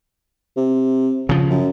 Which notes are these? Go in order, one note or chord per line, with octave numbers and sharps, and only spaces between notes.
C3
C#3 F3
F#2